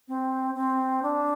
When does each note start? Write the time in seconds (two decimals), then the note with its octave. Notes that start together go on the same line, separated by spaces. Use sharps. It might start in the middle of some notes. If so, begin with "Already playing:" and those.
0.08 C4
0.55 C4
1.03 D4